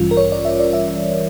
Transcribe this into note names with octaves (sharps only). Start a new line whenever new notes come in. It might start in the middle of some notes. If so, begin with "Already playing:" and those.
Already playing: A1 G2 E3 G3 C#4 F4
A#4
C#5
D5
E5
D5
E5